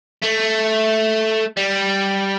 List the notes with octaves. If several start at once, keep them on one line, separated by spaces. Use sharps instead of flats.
A3
G3